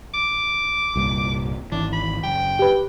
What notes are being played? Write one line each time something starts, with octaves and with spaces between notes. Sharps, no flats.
D6
C2 G2 A#2
G#1 E3 D4
B5
F#1 G5
G4 B4